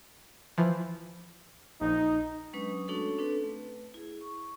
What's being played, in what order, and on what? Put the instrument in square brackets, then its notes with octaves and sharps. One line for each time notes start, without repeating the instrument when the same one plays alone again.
[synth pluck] E3 F3
[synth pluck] A#1 [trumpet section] D#4
[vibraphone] F#3 G#3 C#4 D4 B4 D#6
A3 C#4 D4 F#4 A4 C#5
C4 D4 A4 B4
A3 B4
E4 G#4
C#6